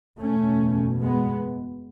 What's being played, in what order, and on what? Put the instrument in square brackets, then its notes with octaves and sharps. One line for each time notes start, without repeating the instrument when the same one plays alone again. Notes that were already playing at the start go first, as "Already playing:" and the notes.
[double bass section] F#1 E2 B2 A3 C#4
G#3 B3